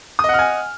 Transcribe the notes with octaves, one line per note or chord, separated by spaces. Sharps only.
D#5 F#5 G#5 D#6 F6